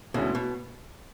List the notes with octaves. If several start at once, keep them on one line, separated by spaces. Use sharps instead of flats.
D2 B2 D3 G#3 C#4 E4
B2